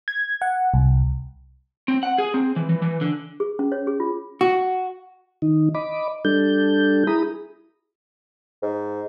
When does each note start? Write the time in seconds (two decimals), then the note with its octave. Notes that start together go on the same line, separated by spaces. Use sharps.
0.08 G#6
0.42 F#5
0.74 C2
1.88 C4
2.03 F#5
2.18 G#4
2.34 C4
2.56 E3
2.69 E3
2.82 E3
3.01 D3
3.40 G#4
3.59 C#4
3.72 C#5
3.87 G#4
4.00 F4
4.41 F#4
5.42 D#3 D#4
5.75 D#5 B5 D6
6.25 G3 D4 A4 G6
7.07 E4 G#4 A#5 B5 D#6
8.62 G#2